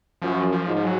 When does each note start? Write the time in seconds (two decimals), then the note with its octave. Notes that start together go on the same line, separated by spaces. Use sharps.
0.21 F#2 F3
0.52 F3
0.67 G#2
0.76 F3
0.84 F#3